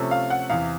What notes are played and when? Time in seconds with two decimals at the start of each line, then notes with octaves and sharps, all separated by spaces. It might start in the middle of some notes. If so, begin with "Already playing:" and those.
Already playing: C3 F3 A3 C#4
0.11 F5
0.30 F#5
0.50 E2 C3 E3 F5